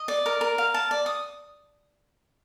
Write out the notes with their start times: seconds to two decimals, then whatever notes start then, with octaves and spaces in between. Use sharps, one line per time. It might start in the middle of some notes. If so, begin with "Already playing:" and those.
Already playing: D#5
0.08 D5
0.26 A#4
0.41 A#4
0.58 F5
0.74 A5
0.91 D5
1.06 D#6